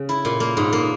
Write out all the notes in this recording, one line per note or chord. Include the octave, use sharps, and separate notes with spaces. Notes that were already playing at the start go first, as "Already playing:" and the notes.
Already playing: C#3
E4
A#2
A#3
G#2
A#3